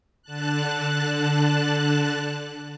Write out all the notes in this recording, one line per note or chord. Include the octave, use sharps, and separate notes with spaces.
D3 A5 F#6